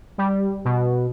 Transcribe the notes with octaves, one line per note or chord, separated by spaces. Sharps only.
G3
B2